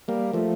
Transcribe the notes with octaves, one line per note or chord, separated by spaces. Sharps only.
G3 A#3
F3 A3